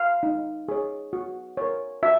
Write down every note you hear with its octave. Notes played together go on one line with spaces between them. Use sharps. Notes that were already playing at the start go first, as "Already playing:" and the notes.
Already playing: F5
D#4
G#4 C#5
F#4
A#4 C#5
F#4 E5